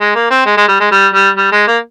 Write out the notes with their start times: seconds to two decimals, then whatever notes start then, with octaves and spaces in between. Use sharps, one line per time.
0.01 G#3
0.15 A#3
0.31 C4
0.46 G#3
0.57 G#3
0.68 G3
0.80 G#3
0.92 G3
1.14 G3
1.37 G3
1.52 G#3
1.67 A#3